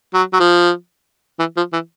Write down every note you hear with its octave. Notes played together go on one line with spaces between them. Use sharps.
F#3
F#3
F3
E3
F3
E3